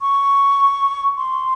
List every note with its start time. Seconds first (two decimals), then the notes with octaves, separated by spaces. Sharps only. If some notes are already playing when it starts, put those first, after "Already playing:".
0.01 C#6
1.17 C6